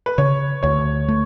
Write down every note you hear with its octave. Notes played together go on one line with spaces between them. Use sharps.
B4
C#3 C#5
D2 C#5
A3